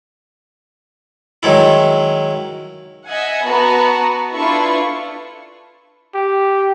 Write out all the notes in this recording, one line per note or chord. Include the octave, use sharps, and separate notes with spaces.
D#3 F#3 G#3 E4
D#5 E5 F#5 G#5
B3 F#4 B4 A5 A#5
D4 E4 F4 A4 B4 C#6
G4